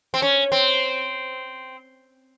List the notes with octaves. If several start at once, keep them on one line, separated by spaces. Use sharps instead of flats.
C4
C#4
C4